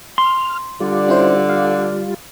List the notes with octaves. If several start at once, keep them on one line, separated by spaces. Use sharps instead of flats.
C6 F6
D3 G3 F4 D5
C#4 E4 C5
F5